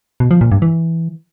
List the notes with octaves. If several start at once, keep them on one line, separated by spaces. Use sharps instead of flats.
B2
F3
A#2
G2
E3